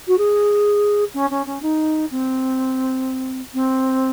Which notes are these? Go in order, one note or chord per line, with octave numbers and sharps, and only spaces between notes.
F#4
G#4
C#4
C#4
C#4
D#4
C4
C4